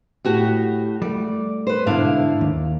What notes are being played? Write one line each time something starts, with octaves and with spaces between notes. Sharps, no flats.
A2 F#4 G4
G3 A3 D5
B4 C5
G#2 B2 D3 D4 E4 F5
D#2